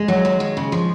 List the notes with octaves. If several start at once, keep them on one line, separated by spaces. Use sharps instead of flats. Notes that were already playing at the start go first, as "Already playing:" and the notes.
Already playing: G#3
F#3
D#2
D#2
C#3
F3